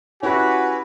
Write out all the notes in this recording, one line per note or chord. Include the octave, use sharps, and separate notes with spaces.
C#4 E4 F#4 G4 B4 G#5